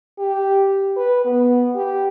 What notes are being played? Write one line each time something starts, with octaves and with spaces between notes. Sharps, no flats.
G4
B4
B3
G4